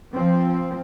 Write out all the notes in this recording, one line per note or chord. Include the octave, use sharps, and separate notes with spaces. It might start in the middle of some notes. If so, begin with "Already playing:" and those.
F3 C4